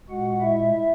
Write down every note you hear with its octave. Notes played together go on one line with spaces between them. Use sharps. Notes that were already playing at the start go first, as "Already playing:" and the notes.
A#2 G#3 F#4 F#5
E4 E5